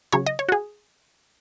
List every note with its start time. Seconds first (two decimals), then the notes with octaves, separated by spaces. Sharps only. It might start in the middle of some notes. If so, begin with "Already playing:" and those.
0.12 C#3 F#3 C#5
0.26 D#5
0.39 C#5
0.49 F#4
0.52 G#4